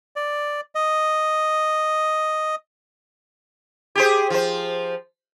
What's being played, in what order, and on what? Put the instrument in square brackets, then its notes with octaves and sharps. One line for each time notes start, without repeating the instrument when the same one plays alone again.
[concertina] D5
D#5
[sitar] G4 G#4 C5
F3 C5